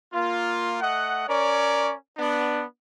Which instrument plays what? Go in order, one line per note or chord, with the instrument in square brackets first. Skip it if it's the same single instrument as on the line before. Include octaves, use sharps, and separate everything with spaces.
[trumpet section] A#3 F4
A3 D#5 F#5
C#4 A#4 C#5 D5
B3 D4